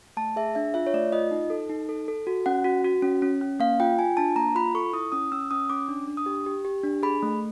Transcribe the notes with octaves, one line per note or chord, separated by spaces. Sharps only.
A3 A5
G#4 E5
D4 E5
F4 E5
C#5
A3 D5
F4 D#5
D#4
A4
D#4
A4
A4
F#4
C#4 F#5
F#4
F#4
C#4
C#4
C#4
A#3 F5
F4 G5
F4 G#5
D4 A5
A#3 A#5
F4 B5
A4 C#6
E4 D#6
C#4 D#6
C#4 E6
C#4 D#6
C#4 D6
D4
D4
D#6
G4
G4
G4
D4
G#4 B5
A3